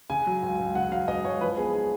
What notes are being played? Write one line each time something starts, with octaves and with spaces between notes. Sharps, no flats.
C#3 G#5
F#3
C#2
C#2
C#3 F#5
F#3 F5
C#2 D#5
C#2 C#5
F3 B4
B3 G#4
D#4 G#4